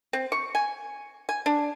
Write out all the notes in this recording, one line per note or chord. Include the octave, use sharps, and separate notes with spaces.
C4
C#6
G#5
G#5
D4